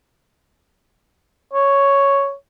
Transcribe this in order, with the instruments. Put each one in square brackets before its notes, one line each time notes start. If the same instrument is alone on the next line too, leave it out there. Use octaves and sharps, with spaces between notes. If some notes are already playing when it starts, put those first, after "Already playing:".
[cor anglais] C#5